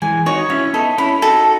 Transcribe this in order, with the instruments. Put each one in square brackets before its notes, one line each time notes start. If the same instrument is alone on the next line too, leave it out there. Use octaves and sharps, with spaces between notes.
[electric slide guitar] E3 G#3 [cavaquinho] G#5
[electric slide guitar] D#4 F#4 [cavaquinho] C#5
[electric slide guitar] C#4 E4 [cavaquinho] E5
[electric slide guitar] B3 D#4 [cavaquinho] A4
[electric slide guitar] C#4 E4 [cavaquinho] B5
[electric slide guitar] D#4 F#4 [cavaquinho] A4